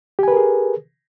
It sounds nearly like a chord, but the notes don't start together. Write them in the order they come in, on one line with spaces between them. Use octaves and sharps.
G4 G#5 B4 A#4 G#4